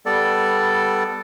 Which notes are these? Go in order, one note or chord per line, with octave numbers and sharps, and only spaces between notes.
G3 B3 A4 D5